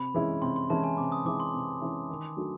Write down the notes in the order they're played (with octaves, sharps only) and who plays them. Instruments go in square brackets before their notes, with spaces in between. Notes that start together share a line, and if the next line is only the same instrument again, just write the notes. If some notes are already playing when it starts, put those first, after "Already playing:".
Already playing: [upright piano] C3 [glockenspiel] B5
[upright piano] E3 G#3 C#4 E4
[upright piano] C3 [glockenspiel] C6
[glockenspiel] C6
[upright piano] E3 G#3 C#4 E4 [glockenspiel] A5
[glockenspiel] G#5
[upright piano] C3 [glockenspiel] D6
[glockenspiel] D#6
[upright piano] E3 G#3 C#4 E4 [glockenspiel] D6
[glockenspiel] C6
[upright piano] C3
E3 G#3 C#4 E4
D#3
F#3 A3 D4 F#4